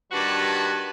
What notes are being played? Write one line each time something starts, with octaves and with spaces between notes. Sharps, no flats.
G2 D#3 G3 F#4 B4 A5